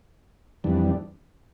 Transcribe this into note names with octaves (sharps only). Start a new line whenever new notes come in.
F2 E3 G3 D4